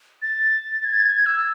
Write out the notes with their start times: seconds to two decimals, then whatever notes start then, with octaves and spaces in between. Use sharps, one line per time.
0.22 A6
0.85 G#6
1.00 A6
1.06 G#6
1.26 E6